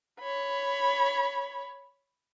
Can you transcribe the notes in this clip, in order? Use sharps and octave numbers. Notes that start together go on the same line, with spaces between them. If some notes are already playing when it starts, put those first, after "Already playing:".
C#5 B5